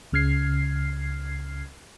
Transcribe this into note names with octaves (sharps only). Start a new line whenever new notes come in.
C#2 C#3 F6 G#6 C7